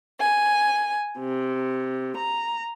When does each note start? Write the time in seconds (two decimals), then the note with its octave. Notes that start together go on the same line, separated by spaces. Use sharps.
0.20 G#5
1.18 C3
2.16 A#5